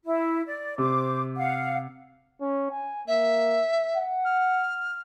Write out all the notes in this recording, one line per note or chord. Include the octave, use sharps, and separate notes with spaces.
E4
D5
C3 C5 D6
F5 F#5
C#4
G#5
A#3 E5
F#5
F6